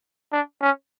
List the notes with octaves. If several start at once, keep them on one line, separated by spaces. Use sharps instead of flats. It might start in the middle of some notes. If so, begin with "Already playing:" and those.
D4
C#4